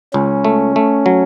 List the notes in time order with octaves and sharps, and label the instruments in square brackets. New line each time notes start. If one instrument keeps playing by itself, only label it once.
[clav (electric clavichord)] C#2 [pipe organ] C#4
[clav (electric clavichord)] A3
A3
F#3